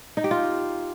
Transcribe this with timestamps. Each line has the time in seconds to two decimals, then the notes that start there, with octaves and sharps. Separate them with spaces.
0.17 D#4
0.24 G4
0.31 F4